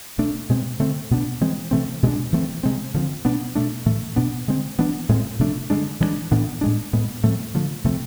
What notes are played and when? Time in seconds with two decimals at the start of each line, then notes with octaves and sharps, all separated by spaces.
0.18 B2 A3 D4
0.49 B2 G#3 C4
0.79 D3 A3 C4
1.11 B2 B3 D4
1.41 E3 G#3 C4
1.71 C3 E3 A3 C4
2.03 B2 G#3 D4
2.32 E3 A3 C4
2.63 C3 G#3 C4
2.94 D3 F3 A3 C4
3.25 B2 B3 D4
3.55 B2 A3 D4
3.86 A2 E3 A3
4.16 B2 B3 D4
4.48 D3 G#3 C4
4.78 E3 B3 D4
5.09 A2 G#3 C4
5.39 C3 F3 A3 D4
5.70 D3 F3 G#3 D4
6.00 E3 G#3 B3 D4
6.31 A2 E3 B3 D4
6.61 A2 G#3 D4
6.93 A2 G#3 B3
7.23 A2 F3 A3 C4
7.54 D3 F3 A3
7.84 C3 F3 A3 C4